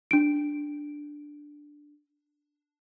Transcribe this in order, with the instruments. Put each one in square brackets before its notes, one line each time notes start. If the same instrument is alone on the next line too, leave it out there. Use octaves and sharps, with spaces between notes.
[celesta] D4 D7